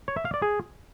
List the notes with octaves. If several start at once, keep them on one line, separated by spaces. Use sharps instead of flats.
C#5
E5
F5
D5
G#4